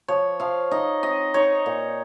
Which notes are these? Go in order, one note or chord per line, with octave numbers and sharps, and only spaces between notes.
F3 C#5
F3 F5
D#4 D#5
C4 D#5
D#4 C#5
A#2